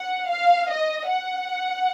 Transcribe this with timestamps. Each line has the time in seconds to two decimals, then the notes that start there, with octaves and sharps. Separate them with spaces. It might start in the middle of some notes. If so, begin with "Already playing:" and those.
Already playing: F#5
0.30 F5
0.69 D#5
1.09 F#5